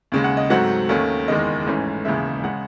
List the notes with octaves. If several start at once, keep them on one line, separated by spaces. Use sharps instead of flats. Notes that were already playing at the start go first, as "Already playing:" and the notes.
D#2 C#3 G#3
F#5
D#5
G#2 F#3 A3 C4 F#5
D#2 D#3 A3 C#4
F#1 E2 D#3 G#3 D#5
A1 G#2 E3 A3 C#4
E1 D#2 C#3 E3 G#3 E5
C#3 G#3 F#5